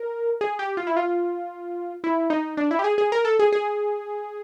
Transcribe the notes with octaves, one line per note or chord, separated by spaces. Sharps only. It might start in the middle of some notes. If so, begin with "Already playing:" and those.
Already playing: A#4
G#4
G4
F4
E4
F4
E4
D#4
D4
E4
G4
G#4
G#4
A#4
A4
G#4
G#4